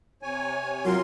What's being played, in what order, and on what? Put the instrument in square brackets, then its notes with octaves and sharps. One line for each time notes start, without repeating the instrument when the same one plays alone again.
[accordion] C3 C#5 G#5
[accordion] C3 A#4 C6 [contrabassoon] F#3 [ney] F4